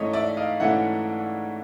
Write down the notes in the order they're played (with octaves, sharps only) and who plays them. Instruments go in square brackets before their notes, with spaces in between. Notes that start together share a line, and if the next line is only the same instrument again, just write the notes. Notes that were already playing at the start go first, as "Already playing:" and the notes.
Already playing: [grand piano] G#2 E3 A3 C#4 C#5 D#5
D5 E5
D#5 F5
G#2 E3 A3 C#4 E5 F#5